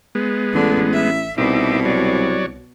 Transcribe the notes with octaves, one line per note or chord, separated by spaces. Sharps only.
G#3 B3
A1 D3
E5
C2 B2 D#4 E5 D6
F#3 C#5 D5